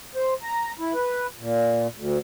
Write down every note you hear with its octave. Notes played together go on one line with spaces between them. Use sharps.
C5
A#5
E4
B4
A#2
D2